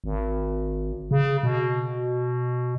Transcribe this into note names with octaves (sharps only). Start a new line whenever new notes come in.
G#1
C#3
B2